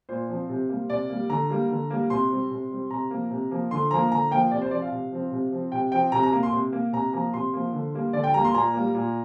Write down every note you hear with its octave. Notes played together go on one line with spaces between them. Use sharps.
A#2 C5
F3 C4
C3
G3 A#3
C3 D5
G3 A#3
D3 A#5
G3 A#3
D3
G3 A#3
C3 C6
G3 C4
C3
G3 C4
C3 A#5
F3 A#3
C3
F3 A#3
D3 C6
F3 A#3 A#5
D3 A#5
F3 A#3 G5
C3 D5
C5
F3 C4 D5
F5
C3
F3 C4
C3
F3 C4
C3 G5
F3 C4 G5
C3 A#5
A#5
A#3
C6
C3
A#3
C3 A#5
F3 A#3 A#5
C3 C6
F3 A#3
D3
G3 A#3
D3 D5
G5
G3 A#3 A#5
C6
A#2 A#5
A#3
G3
A#2